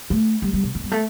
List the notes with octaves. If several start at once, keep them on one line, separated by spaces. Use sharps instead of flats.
A3
G3
G3
B2
D3
G3
A3